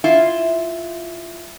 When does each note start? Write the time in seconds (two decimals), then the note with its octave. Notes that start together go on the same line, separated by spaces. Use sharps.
0.04 E4 F4